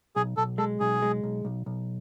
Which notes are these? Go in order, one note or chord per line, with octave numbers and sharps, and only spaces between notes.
B1 G#4
B1 A4
G#3 A4
B1 G#4
G#3
B1
B1
B1